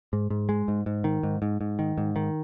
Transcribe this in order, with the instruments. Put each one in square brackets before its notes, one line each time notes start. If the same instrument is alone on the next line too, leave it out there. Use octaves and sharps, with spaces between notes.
[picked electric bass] G#2
G#2
G#3
G#2
G#2
D#3
G#2
G#2
G#2
D#3
G#2
D#3